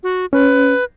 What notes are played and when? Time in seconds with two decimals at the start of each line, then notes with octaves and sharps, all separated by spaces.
0.03 F#4
0.33 C#4 B4